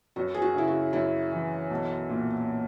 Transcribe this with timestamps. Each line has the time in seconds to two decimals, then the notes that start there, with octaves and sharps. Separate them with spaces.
0.16 F#2 F#4
0.34 G#4
0.42 F#4
0.55 C#3 E4
0.67 F#4
0.93 F#2 E4
1.32 E3
1.71 B1
2.09 A#2